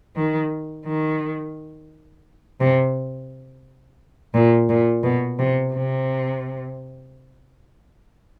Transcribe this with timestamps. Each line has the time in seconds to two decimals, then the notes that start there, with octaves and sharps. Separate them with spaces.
0.16 D#3
0.85 D#3
2.60 C3
4.34 A#2
4.69 A#2
5.03 B2
5.39 C3
5.74 C3